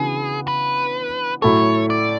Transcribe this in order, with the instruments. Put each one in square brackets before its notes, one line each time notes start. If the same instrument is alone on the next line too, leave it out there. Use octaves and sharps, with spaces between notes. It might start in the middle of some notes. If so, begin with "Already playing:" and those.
Already playing: [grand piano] C#3 E3 B3 D4 F#4 [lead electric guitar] G#4
[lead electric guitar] B4
[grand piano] A2 F#3 A3 E4 A4 [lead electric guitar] C#5
[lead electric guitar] D5